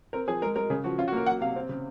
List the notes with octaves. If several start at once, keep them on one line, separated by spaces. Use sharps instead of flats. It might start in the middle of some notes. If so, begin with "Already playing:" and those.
C4 A#4
F3 G#4
G#3 A#4
G#3 A#4
C#3 G#4
F3 F#4
C#4 F4
F#4
A#3 A#4
F#3 F#5
C3 F5
C4
C#3